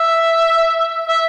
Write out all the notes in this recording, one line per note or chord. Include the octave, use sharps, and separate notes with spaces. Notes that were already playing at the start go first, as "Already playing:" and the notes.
Already playing: E5
E5